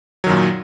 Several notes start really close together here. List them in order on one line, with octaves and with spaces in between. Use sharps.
F#3 D#3 F#2 A#2